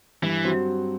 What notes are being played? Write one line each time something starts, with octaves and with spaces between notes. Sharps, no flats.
G2 E3
F#3 C4 F#4 C5